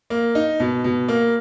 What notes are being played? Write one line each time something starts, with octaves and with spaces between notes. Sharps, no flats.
A#3
D#4
B2
B2
A#3